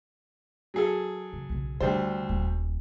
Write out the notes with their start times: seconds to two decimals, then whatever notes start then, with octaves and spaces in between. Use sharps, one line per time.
0.74 F#3 G#4 A4
1.33 C#3
1.49 B1 C#3
1.81 D2 D3 G3 C5
2.29 D#1